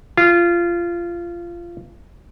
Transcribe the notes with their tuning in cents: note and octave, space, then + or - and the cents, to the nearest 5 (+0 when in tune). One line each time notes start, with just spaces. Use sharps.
F4 -20